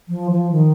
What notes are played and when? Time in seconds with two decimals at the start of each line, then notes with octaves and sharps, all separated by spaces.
0.08 F3
0.31 F3
0.52 D#3